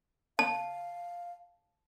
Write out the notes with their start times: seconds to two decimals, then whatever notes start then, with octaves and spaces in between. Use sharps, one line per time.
0.39 F5 A5